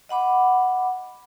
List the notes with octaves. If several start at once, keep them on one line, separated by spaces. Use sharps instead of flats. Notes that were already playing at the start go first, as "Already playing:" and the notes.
D#5 F#5 B5 D6